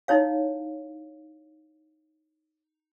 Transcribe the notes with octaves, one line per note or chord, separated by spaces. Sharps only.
D#4 E4 C#5 F5